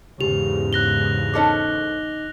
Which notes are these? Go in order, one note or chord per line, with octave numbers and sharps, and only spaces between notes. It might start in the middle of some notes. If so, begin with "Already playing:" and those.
E2 G#2 C#3 G4 F7
F#6 A#6 G7
C#4 D#4 A4 C5 D#5 D6